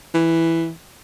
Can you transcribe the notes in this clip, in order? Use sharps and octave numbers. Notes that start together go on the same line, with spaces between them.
E3